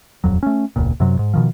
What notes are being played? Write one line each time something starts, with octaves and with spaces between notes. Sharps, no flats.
D#1 F2 F#3
A3 C#4
E1 C#2 A#2
F#2 C3 F#3
G#2
B2 D#3 F3